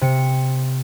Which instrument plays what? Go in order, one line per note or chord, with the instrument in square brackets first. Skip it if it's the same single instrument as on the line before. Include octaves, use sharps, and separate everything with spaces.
[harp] C3 C#7